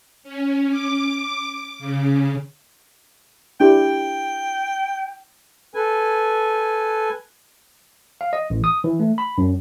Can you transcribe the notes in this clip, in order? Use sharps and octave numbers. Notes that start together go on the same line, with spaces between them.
C#4
D6
C#3
D4 E4 G4 G5
A4 B4 G#5
F5
D#5
A1
D#6
E3
A3
B5
F#2